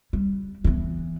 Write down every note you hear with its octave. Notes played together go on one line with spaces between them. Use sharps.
G3
E3 B3